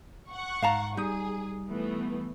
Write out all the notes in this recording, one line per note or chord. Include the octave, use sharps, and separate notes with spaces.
F#5 C#6
G#2 F5 A5 A#5
G3 D#4 G#4 D#6
E3 A3 B3